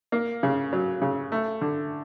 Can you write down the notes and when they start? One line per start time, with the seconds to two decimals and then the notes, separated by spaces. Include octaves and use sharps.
0.12 A#3
0.43 C#3
0.73 F#3
1.02 C#3
1.32 A3
1.61 D3